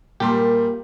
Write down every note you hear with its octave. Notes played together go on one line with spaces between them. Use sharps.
A#2 G3 G4 A#4 C6